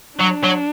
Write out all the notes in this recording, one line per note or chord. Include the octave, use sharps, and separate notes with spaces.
F#3 D4
F#3